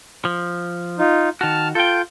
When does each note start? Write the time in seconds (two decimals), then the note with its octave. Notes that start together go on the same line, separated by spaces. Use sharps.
0.25 F3
0.98 D#4 F4
1.41 D#3 F#4 A5 F6
1.75 F4 A4 G5 G6